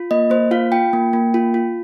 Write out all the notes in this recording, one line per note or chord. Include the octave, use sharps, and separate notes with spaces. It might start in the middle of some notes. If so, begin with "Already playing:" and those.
Already playing: F4
A#3 D#5
A#3 C5
F4 F5
F4 G5
A#3
A#3
F4
F4